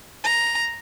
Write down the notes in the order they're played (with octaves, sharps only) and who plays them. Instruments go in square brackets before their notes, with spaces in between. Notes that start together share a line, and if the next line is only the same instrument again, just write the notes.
[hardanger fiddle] A#5